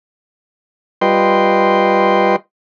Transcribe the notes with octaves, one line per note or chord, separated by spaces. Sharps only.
G3 F4 B4 D#5 G5 C6